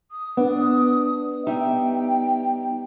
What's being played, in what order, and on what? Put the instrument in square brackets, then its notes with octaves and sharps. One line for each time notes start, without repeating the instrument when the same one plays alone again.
[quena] D#6
[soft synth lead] B3 [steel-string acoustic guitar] D4
[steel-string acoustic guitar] G3 D#4 E5 [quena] G5